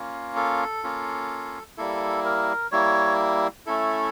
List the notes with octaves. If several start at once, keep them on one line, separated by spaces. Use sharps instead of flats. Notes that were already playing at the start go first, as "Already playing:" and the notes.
Already playing: A#3 C#4 F4
A4
A#3 C#4 F4
G3 A#3 E4 A4
A#4
G3 A#3 E4 C#5
A3 C#4 E4 A4